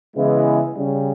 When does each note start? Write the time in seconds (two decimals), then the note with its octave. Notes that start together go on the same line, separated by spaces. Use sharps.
0.16 C#3 E3 G#3 B3 E4
0.74 C#3 G3 C#4